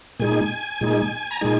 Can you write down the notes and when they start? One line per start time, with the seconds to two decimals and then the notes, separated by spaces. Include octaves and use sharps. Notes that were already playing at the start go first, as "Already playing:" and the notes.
0.20 A#2 G#3 D#4 G#5
0.81 A#2 G#3 D#4
1.31 A#5
1.41 A#2 G#3 D#4 G#5